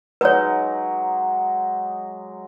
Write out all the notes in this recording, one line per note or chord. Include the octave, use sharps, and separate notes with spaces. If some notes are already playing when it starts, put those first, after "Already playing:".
F#3 G#3 D#4 B4 C#5